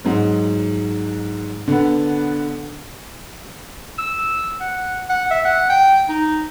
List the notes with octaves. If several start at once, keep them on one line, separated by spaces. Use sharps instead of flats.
G#2 F#3
D3 B3
E6
F#5
F#5
E5
F#5
G5
D#4